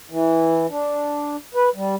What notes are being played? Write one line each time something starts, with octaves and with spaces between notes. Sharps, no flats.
E3
D4
B4
G3